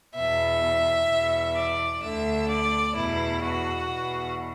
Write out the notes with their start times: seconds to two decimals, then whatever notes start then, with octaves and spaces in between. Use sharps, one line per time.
0.15 E2 B2 E5
1.08 E2 B2
1.55 D5
2.01 D2 D3 E5
2.48 D5
2.94 E2 B2 E4
3.42 F#4
3.88 E2 B2